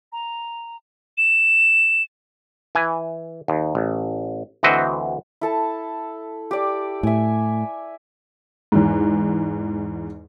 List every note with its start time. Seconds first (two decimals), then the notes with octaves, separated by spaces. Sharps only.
0.12 A#5
1.18 E7
2.75 E3 G#5
3.48 D#2
3.75 A1
4.63 D2 E3 C4 F#4 D#5 E5
5.41 E4 A4 A5
6.51 G4 D5 G5
7.03 A2 E5 G#5
8.72 E2 G#2